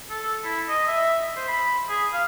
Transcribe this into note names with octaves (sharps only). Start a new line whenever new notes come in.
A4
E4
D#5
E5
C5
B5
G#4
F5